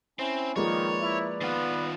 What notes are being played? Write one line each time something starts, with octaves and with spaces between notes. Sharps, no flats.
C4 C#4 E4
D#3 F3 G#3 A#3 B4 C#5 D5
E4
D#3 B3 F4